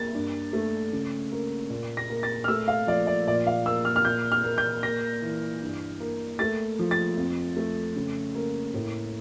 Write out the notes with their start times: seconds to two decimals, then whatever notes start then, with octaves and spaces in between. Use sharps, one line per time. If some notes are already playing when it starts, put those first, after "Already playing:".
Already playing: A#3 A6
0.15 G2
0.53 A3
0.93 C#3
1.32 A#3
1.70 A#2
1.97 A#6
2.10 A#3
2.23 A6
2.44 F6
2.48 A3 E6
2.68 F5
2.87 F3 D5
3.07 D5
3.27 A#2 D5
3.47 F5
3.65 A#3 E6
3.85 F6
3.96 F6
4.05 A#2 G6
4.32 F6
4.44 A#3
4.58 G6
4.83 A#3 A#6
5.22 E3
5.62 G2
6.00 A#3
6.39 A3 A6
6.79 F3
6.91 A6
7.17 F2
7.57 A3
7.96 C#3
8.35 A#3
8.74 A2